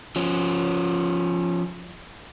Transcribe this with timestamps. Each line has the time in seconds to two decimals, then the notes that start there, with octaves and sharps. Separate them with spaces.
0.16 F3 C#4